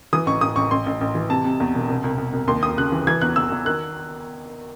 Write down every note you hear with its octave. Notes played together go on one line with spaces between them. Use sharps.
E3 D#6
A1 C#6
A1 D#6
A1 C#6
A1 C6
A1
A1
E3
C3 A5
C3
E2
E1
C2
C2
C2
C2
D#2 C6
D#2 D#6
C#3 F#6
E3
E3 G#6
E2 F#6
E2 E6
E2
D#3 F#6